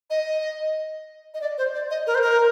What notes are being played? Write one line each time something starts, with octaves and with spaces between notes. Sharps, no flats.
D#5
D#5
D5
C5
D5
D#5
A#4
C5
A#4